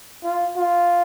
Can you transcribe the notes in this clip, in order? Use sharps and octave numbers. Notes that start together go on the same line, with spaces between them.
F4
F4